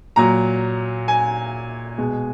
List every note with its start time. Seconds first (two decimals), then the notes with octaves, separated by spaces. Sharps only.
0.16 A#2 F#3 A#5
1.08 G#5
1.98 B2 G#3